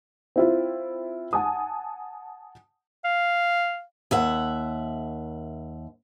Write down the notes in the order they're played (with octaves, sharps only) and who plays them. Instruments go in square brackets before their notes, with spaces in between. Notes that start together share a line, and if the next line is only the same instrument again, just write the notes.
[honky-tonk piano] C4 E4 F4
F#5 G#5 A5 D#6
[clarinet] F5
[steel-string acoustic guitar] D#2 E5 F#5